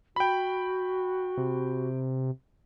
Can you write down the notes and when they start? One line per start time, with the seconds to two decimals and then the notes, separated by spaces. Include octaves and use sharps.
0.16 F#4 G5 B5
1.37 C3